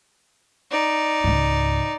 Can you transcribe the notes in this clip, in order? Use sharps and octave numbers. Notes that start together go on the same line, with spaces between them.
D#4 D5
C#2 G#2